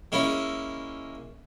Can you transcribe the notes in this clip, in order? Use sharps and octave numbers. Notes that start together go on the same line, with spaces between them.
G#3 A#3 C#4 E4